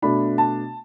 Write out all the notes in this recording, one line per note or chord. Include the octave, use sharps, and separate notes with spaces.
B2 A3 D4 B5
A5